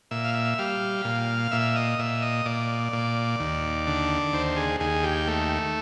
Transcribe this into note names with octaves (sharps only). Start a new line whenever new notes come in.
A#2 E5
F5
E5
G3 F5
A#2
A#2 E5
D#5
A#2 E5
D#5
A#2 D5
A#2
D#2
D3
D#2 C5
G#4
D#2 G#4
G4
A3